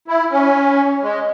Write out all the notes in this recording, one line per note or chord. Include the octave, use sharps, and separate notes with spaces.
E4
C#4
G#3